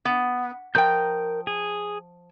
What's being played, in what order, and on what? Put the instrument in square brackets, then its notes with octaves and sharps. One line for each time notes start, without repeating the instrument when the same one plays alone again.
[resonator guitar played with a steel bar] B3
[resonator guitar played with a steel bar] F3 G5 [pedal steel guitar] A#4 A#5 G6
[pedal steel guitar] G#4